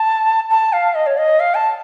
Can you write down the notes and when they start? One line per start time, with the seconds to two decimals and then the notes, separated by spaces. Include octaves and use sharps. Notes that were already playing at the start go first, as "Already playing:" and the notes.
Already playing: A5
0.50 A5
0.73 F5
0.95 D#5
1.06 C#5
1.17 D#5
1.40 F5
1.55 A5